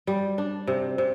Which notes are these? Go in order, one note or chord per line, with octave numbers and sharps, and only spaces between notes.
G3
D4
C3
C3